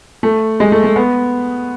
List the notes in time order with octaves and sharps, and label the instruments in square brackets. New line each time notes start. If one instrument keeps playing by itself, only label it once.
[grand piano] A3
G#3
A3
A3
B3